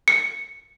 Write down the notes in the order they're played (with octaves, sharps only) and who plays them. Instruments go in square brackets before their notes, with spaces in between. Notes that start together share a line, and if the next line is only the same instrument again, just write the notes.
[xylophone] C#7